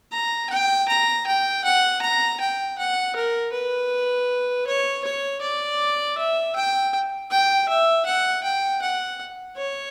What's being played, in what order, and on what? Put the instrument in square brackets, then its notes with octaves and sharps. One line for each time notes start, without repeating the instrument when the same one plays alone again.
[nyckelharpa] A#5
G5
A#5
G5
F#5
A#5
G5
F#5
A#4
B4
C#5
C#5
D5
E5
G5
G5
E5
F#5
G5
F#5
C#5